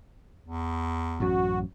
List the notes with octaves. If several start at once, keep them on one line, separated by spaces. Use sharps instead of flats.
E2
A1 F#2 F#4